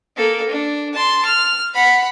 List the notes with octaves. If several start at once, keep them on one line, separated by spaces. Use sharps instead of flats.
A#3 A4
D4
A5 C6
F6
F#5 B5